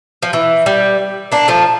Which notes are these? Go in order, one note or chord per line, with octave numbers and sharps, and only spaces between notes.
F3
E3
G3
A#3 D4
F3 A3